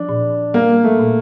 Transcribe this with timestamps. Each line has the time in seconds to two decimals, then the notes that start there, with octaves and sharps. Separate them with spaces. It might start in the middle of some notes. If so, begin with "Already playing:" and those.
Already playing: F3 D4
0.09 A#2
0.54 G3 A#3
0.84 A3
0.99 A#2